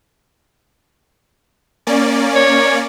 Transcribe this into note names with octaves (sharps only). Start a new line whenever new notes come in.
A#3 C#4 D5
C#5